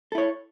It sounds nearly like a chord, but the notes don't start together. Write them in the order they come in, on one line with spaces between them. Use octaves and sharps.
A4 E4 C#5